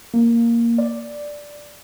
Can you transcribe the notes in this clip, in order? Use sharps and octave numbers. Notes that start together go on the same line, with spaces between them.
A#3
D5